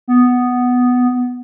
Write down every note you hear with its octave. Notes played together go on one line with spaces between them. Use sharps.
B3